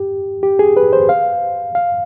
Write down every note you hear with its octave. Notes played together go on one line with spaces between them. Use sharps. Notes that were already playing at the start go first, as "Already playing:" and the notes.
Already playing: G4
G4
G#4
B4
C5
F5
F5